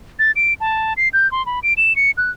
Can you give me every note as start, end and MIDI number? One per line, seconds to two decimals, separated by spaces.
0.19 0.32 93
0.36 0.54 98
0.60 0.94 81
0.97 1.09 96
1.13 1.30 91
1.32 1.45 84
1.46 1.60 83
1.63 1.74 98
1.77 1.96 100
1.96 2.11 97
2.17 2.31 90